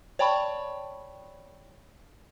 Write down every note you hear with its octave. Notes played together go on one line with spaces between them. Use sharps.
C#5 D5 G5 A5 B5 C#6